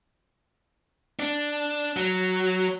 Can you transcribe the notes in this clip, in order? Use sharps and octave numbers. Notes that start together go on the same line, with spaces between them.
D4
F#3